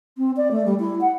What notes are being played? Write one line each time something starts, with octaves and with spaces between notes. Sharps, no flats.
C4
D5
A3
G3
E4
F#5